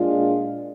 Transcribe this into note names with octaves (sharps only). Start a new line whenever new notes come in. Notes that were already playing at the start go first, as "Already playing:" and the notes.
Already playing: A#2 G#3 D4 F4